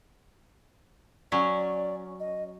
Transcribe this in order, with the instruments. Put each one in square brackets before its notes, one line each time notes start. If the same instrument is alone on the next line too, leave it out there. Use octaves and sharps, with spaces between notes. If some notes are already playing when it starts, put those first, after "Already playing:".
[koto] F#3 C#4 [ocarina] D5
[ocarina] D#5